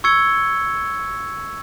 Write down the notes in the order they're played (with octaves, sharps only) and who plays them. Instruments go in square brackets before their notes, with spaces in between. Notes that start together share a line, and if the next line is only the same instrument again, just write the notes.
[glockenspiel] C#6 E6 G#6 C#7 G7